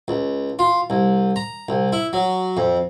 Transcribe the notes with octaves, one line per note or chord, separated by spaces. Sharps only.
C#2
F4
C2
A#5
C2
E4
F#3
F2